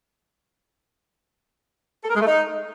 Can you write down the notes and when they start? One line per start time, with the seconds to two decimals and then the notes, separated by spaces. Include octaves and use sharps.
2.04 A4
2.10 A#4
2.16 G#3
2.21 A3
2.27 D#4